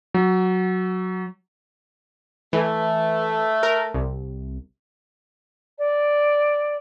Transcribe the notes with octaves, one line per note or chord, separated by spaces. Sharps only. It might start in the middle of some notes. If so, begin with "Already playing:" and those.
F#3
E3 A3
A#4
C2
D5